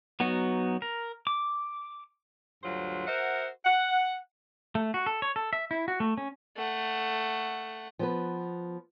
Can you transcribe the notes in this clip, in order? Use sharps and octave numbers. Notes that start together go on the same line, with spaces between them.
F#3 B3 D#4 F#4
A#4
D6
D2 G2 F#3 F4 C5
F#4 A#4 C5 E5 F#5
F#5
A3
F#4
A4
C#5
A4
E5
E4
F#4
A3
C#4
A3 F#5
F3 B3 B4